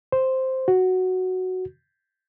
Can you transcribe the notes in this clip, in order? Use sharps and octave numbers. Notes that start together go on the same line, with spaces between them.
C5
F#4